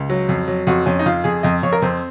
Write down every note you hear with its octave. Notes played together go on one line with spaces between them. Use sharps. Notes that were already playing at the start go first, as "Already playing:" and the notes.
Already playing: C#2
F#3
F2
F#3
F2 F#4
F2 C#4
D#4
F2 F4
F2 G#4
F2 D#5
F2 C#5
A#4
F2 C4